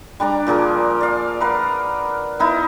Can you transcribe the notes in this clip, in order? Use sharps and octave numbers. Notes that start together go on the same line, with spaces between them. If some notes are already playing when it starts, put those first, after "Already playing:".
G3 D4 D5 A#5
A#2 F3 G#4 A#4
D5 F5
A#4 B4 F5 F#5
B3 D#4 E4